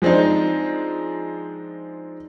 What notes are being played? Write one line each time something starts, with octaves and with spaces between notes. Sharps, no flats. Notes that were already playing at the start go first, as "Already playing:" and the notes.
F3 G#3 C4 D4 D#4